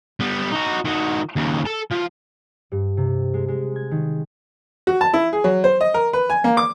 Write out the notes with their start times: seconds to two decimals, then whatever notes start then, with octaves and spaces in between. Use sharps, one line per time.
0.20 G3 B3
0.52 D#4 F#4
0.85 D#3 F#4
1.36 D#2 C#3
1.65 A4 A5
1.91 F3
2.72 G2
2.97 C3
3.34 G#3
3.48 G#3
3.76 G#6
3.91 D#3
4.87 F#4
5.01 A5
5.13 E4
5.33 G#4
5.44 F#3
5.64 C5
5.81 D#5
5.94 A#4
6.13 B4
6.30 G#5
6.44 A#3
6.57 D6